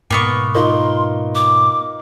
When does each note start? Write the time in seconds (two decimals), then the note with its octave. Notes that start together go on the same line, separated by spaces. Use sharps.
0.11 G#2 B2 A#3 B3 C#6
0.55 D#4 F4 A#4 C6
1.35 D6